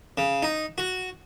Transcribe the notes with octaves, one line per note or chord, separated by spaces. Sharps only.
C#3
D#4
F#4